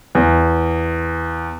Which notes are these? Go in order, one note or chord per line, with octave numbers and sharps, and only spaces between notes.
E2